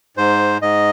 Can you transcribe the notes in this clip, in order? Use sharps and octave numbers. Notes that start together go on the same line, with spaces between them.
G#2 C5
G#2 D#5